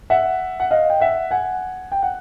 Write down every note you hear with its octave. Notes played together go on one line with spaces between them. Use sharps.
E5 F#5
F#5
D#5 F5
G5
E5 F#5
F#5 G#5
G5
F#5